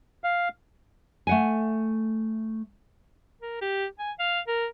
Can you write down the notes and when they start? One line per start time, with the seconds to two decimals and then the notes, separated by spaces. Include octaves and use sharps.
0.24 F5
1.27 A3 F#5 G#5
3.41 A#4
3.61 G4
3.99 G#5
4.19 F5
4.47 A#4